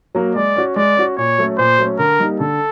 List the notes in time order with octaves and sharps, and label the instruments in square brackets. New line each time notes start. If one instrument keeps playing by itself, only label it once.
[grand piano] F#3 A#3
[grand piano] G#3 [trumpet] D5
[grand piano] C#4 F#4
[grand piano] G#3 [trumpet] D5
[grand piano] C#4 F#4
[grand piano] A#2 [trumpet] C#5
[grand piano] F#3 A3 C#4
[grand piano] A#2 [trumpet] C5
[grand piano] F#3 A3 C#4
[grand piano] D3 [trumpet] A#4
[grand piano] G3 A#3 D#4
[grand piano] D3 [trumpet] A4